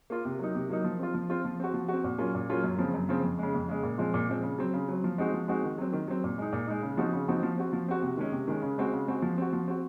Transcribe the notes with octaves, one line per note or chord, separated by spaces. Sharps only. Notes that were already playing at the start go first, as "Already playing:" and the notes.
A#3 F4
C3
F#3 A#3 D#4
C3
F#3 A#3 D#4
F3
C4 F4
F3
C4 F4
F3
C4 F#4
F3
C4 F#4
A#2
F#3 A#3 C#4 F4
A#2
F#3 A#3 C#4 F4
F#2
C#3 F3 C4
F#2
C#3 F3 C4
F2
C#3 G#3
F2
C#3 G#3
A#2
F3 G#3 C4 F4
A#2
F3 G#3 C4 F4
C#3
F#3 C4
C#3
F#3 C4
F3
G#3 C4 D#4 F#4
F3
G#3 C4 D#4 F#4
D#3
F#3 C4
D#3
F#3 C4
A#2
G#3 D#4
A#2
G#3 D#4
C#3
F3 C4 D#4 F#4
C#3
F3 C4 D#4 F#4
F3
C4 F#4
F3
C4 F#4
C3
D#3 G#3 C#4
C3
D#3 G#3 C#4
C#3
G#3 C4 F#4
C#3
G#3 C4 F#4
F3
C4 F#4
F3
C4 F#4